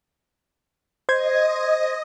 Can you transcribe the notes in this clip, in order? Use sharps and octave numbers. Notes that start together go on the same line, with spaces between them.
C5 D#5 C6 G#6